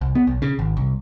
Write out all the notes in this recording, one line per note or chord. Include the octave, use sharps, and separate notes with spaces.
C2
B3
B1
C#3
G#1
C2